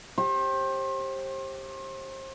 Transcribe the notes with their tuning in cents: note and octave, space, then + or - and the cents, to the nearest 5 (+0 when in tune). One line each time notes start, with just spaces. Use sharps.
G4 +0 C5 +35